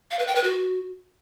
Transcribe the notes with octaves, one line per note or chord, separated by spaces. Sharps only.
F5
B4
G5
B4
F#4